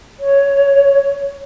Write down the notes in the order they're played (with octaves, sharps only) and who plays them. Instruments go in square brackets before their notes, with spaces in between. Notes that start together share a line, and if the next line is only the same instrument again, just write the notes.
[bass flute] C#5